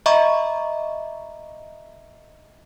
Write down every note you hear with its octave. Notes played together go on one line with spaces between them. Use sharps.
D#5 E5 A#5 B5 C#6 D6